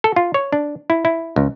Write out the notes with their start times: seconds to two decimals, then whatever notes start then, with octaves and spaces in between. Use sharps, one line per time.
0.04 A4
0.16 F4
0.34 C#5
0.52 D4
0.90 E4
1.05 E4
1.36 C#2